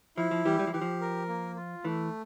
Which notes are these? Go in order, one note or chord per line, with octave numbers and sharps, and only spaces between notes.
F3 E4
F3
E3 G3 G4
G3
F3
E3 G4
F3
A#4
A#3
F4
E3 A3